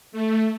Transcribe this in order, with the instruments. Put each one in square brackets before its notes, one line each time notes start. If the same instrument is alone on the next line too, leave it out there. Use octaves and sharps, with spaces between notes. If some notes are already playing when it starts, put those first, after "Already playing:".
[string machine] A3